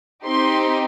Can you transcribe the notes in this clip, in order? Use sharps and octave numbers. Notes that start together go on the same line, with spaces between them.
C4 D#4 G4 C6